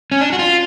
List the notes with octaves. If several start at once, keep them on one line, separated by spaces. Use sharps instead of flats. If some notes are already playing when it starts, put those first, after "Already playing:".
C#4
D4
F#4
F4